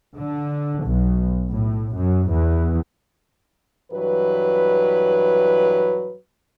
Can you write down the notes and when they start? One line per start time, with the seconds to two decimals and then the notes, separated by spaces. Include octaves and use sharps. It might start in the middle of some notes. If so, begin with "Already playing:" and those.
0.17 D3
0.85 B1
1.51 A2
1.96 F#2
2.31 E2
3.92 G2 E3 F#3 B4